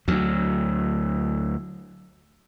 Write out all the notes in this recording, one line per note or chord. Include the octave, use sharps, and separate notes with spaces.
D2 F#3